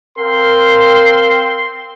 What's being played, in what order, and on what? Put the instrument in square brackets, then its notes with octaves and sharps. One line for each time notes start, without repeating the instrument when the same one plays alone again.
[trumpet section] C4 F5 C6 [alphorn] A#4